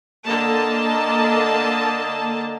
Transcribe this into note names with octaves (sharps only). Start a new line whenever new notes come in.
D3 A#3 D#5 A5